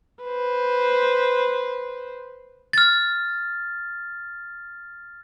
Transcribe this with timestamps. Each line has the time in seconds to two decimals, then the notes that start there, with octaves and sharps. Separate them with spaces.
0.23 B4 C5
2.73 F6 A6